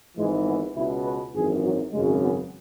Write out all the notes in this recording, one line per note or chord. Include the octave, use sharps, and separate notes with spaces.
G#1 G#2 E3 G#3
B3
C#2 B2 E4
B4
G#1 F#2 E3 G#4
F#3
G#1 F#2 C#3 G#3
B3